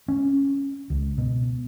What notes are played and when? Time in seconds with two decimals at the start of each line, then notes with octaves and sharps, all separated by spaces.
0.08 C#4
0.90 C#2
1.18 B2